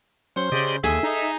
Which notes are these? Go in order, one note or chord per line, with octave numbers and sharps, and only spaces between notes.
F#3 C#4 C5
C#3 G4 D5 D#5
D#2 G#4 A4 E5
D#4